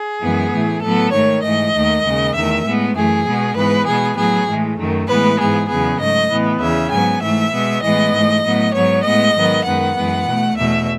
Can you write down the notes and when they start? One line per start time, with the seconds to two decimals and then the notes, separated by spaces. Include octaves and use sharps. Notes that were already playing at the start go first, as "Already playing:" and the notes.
Already playing: G#4
0.21 F#2 E3 G#3 B3
0.52 A2 E3 A3
0.82 A2 F#3 B3 A4
1.12 G#2 D#3 A3 C#5
1.43 G#2 E3 A3 D#5
1.74 D#2 D#3 A3
2.04 D#2 C#3 G#3
2.35 E2 D#3 A3 E5
2.65 A2 G#3 B3
2.96 F#2 E3 A3 G#4
3.26 B2 G#3 B3
3.56 G#2 E3 G#3 B3 B4
3.87 B2 G#3 B3 G#4
4.17 A2 F#3 B3 G#4
4.48 A2 E3 G#3
4.78 F#2 D#3 F#3 A3
5.08 A2 E3 G#3 B3 B4
5.39 G#2 E3 B3 G#4
5.69 E2 C#3 F#3 B3 G#4
5.99 G#2 F#3 A3 D#5
6.30 A2 E3 B3
6.60 E2 C#3 E3 E5
6.91 G#2 F#3 B3 G#5
7.22 G#2 E3 A3 E5
7.52 B2 G#3 B3
7.83 A2 E3 G#3 B3 D#5
8.13 G#2 E3 A3
8.44 A2 F#3 B3
8.74 G#2 F#3 B3 C#5
9.05 A2 G#3 B3 D#5
9.35 G#2 D#3 F#3 B3
9.65 F#2 D#3 G#3 B3 F#5
9.96 F#2 E3 G#3 B3
10.26 B2 A3
10.56 E2 B2 A3 E5